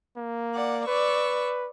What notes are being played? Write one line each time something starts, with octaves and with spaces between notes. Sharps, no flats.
A#3
D5 F#5
B4 D5 C#6 E6